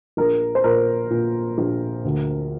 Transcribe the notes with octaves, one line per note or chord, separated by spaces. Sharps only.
A#1 A#4
C5
A#2 A#4
A#2
A#1
D2